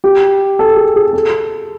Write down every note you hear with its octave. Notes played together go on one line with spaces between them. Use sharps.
G4
A4
G#4
G#4
A4